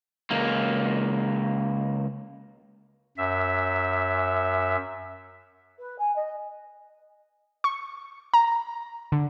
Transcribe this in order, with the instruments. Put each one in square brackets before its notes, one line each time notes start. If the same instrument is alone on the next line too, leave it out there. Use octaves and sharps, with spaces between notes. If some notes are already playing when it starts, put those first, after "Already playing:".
[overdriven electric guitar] C#2 A#3
[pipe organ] F#2 E5
[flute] B4
G#5
D#5
[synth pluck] C#6
A#5
D3